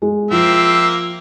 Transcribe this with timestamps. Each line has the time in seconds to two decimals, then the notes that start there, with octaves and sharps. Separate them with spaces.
0.02 G#3
0.31 F3 A#3 C4 E5